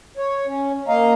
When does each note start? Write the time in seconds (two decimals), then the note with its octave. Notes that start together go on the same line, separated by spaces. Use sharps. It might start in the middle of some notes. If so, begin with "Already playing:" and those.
0.17 C#5
0.47 C#4
0.88 A#3 D#5 F5 A#5